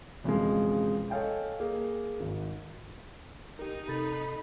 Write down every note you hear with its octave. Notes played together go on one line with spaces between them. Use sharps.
E1 F2 C#3 E3 G#3
A4 C#5 D#5 F5 G5 G#5
A#3 G#4
G#1
D#4 G4 A#4
C3 A4 B5 A6